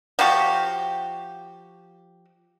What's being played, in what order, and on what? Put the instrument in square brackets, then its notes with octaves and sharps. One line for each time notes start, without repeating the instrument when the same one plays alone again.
[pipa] F3 F#4 G4